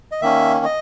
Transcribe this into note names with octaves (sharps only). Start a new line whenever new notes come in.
D#5
D#3 A#3 C#4 E5
D#5